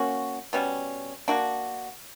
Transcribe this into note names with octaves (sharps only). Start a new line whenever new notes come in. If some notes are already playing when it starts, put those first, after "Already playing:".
Already playing: A#3 C#4 F#4
B2 G3 C#4
A#3 D4 F#4